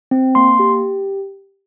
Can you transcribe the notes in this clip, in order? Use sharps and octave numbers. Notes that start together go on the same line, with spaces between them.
C4
A#3 C6
G4